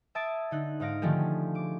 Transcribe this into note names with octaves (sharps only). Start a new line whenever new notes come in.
E5 A5 D#6 G#6 A6 D7
D3 D#4 F#6
G#2 D#4 F5 A#6 D7
D3 D#3 F3 A3 G4 G#4
D6